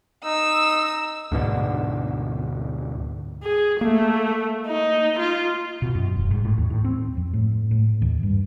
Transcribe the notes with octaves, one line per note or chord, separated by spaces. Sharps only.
D#4 E6
D2 G#2 B2 D3
G#4
A3 A#3
D#4
F4
B2
F#2
E1
G#2
A2
D#2
A2
C4
F2
A2
A2
D#2
G2